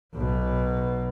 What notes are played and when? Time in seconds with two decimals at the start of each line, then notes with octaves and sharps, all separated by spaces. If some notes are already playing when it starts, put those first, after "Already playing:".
0.15 B1 B2